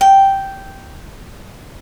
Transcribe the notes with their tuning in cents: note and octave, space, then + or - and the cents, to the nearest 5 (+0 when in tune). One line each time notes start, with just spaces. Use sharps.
G5 -5